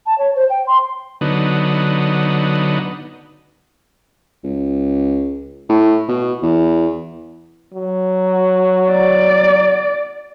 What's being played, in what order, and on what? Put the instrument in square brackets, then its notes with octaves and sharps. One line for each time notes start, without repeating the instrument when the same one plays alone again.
[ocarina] A5
C#5
C5
G5
C6
[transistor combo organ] D3 F#3 B3 D#4
[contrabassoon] C#2
A2
B2
E2
[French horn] F#3
[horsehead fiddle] D5